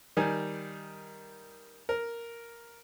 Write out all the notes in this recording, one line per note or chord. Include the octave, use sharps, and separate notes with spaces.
D#3 G3 G#5
A#4